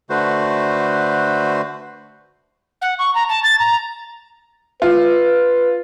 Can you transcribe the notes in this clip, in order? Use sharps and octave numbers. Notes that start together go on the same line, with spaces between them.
D3 A3 F#4 B4 C5
F#5
C#6
A#5
A5
A6
A#5
F4 B4